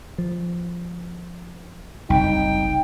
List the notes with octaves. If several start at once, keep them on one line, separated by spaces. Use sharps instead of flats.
F3
F#1 C2 D#4 G5